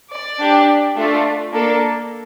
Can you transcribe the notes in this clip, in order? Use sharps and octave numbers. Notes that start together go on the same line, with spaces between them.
D5
D4 G4
A3 D4 F4 A4
A#3 D4 A4